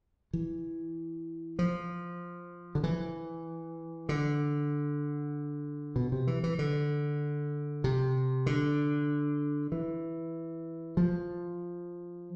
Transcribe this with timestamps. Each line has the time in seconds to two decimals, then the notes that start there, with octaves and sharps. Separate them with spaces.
0.33 E3
1.59 F3
2.75 D3
2.84 E3
4.09 D3
5.96 B2
6.12 C3
6.27 E3
6.44 E3
6.59 D3
7.84 C3
8.46 D3
9.72 E3
10.97 F3